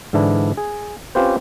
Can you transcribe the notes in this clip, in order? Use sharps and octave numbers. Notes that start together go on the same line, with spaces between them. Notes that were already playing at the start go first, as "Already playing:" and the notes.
G#2 D3 E3 D4 E4
G#4
C4 C#4 F4 G4 B4 C5